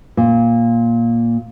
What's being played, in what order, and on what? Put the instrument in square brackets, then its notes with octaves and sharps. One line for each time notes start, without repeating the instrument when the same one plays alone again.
[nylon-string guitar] A#2